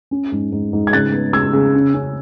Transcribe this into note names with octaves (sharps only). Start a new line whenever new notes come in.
C#4
G#2
G#2
G#2
G#6
C#3 F#6 A6
B3
C#3 E6 G#6
C#3
C#4
C#4